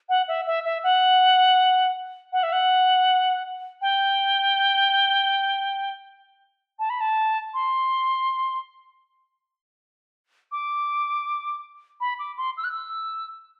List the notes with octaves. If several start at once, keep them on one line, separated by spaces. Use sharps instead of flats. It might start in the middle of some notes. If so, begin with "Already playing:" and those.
F#5
E5
E5
E5
F#5
F#5
E5
F#5
G5
A5
B5
A5
C6
D6
B5
D6
C6
E6
F#6
E6